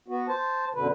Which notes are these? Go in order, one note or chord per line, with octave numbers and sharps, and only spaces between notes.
B3 F#4
C5 A5
F#2 B2 D3 B4